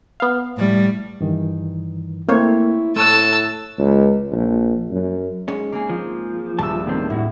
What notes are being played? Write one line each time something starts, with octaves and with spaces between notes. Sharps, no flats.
B3 F5
A2 G3
G2 D#3 E3
A3 A#3 C4 E4 C#5
A2 A3 A4 A5 C#6 E6 F#6
C#2
A#1
F#2
G#2 G#3 C#4
A#3 C4 G#4
F3
D#1 G2 A5 E6
A2 D#3 C4
A2 E4 F#4